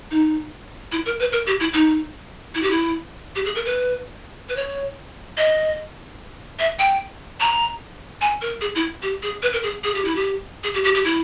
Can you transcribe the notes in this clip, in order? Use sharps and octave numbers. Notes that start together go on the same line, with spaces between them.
D#4
E4
A#4
B4
A#4
G4
E4
D#4
E4
G4
E4
G4
G#4
A#4
B4
B4
C#5
D#5
E5
G5
A#5
G#5
A#4
G#4
E4
G4
G#4
B4
A#4
G#4
G#4
G4
E4
G4
G#4
G4
G4
G4
E4